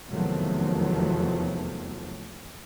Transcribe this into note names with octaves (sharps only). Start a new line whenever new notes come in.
F1 E2 D#3 F3 F#3 A3